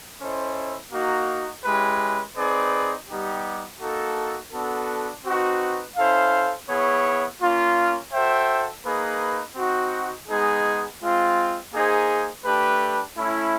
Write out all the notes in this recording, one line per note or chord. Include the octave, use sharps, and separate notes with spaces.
C#4 E4 A4 C5 D#5
A#3 D#4 F#4
G#3 C#4 E4 G4 B4
C4 D#4 G#4 B4 D5
G3 B3 D#4 G4
A#3 D#4 F#4 A4
B3 D4 F#4 A4
C4 D#4 F#4 B4
C#4 E4 A4 C5 F5
B3 E4 G#4 C#5
A#3 C#4 F4
F#4 A4 C5 E5 G5
A#3 D#4 G#4 B4
C4 D#4 F#4
G#3 B3 D#4 G#4
G#3 C4 F4
A#3 D#4 G#4 C5
A3 D4 G4 B4
A3 C#4 E4